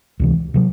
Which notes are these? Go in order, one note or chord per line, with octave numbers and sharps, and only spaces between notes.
C#2 C3 E3
C3 D#3 F#3